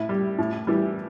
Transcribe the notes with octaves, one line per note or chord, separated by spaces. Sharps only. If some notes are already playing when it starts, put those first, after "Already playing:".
Already playing: A2 E4
G3
A2
E3 G3